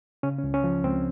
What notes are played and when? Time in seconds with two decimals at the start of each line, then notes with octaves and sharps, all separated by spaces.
0.23 C#3 C#4
0.39 C#4
0.44 C#2
0.54 C#4
0.64 F3
0.84 C#2 C4